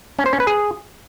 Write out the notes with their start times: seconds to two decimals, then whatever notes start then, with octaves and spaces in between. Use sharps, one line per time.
0.19 C#4
0.26 C5
0.33 C#4
0.40 B4
0.47 G#4